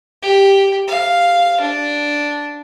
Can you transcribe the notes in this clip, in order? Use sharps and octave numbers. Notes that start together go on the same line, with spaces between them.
G4
F5
D4